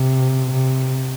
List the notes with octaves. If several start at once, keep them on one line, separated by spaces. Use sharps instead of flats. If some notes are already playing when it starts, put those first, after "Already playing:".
Already playing: C3
C3